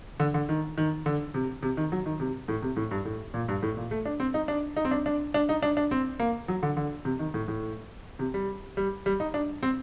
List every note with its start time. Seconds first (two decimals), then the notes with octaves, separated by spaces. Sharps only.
0.20 D3
0.34 D3
0.49 D#3
0.78 D#3
1.06 D3
1.34 C3
1.63 C3
1.77 D#3
1.92 F#3
2.06 D#3
2.20 C3
2.48 A2
2.62 C3
2.76 A2
2.91 G2
3.05 A2
3.34 A#2
3.48 G2
3.63 A2
3.77 A#2
3.91 A3
4.05 D4
4.20 C4
4.34 D#4
4.48 D4
4.77 D#4
4.85 C4
4.91 D4
5.06 D4
5.34 D4
5.49 D#4
5.63 D4
5.77 D4
5.91 C4
6.20 A#3
6.48 F#3
6.63 D3
6.77 D3
7.05 C3
7.19 D#3
7.34 A2
7.48 A2
8.19 C3
8.34 G3
8.77 G3
9.06 G3
9.20 D#4
9.34 D4
9.63 C4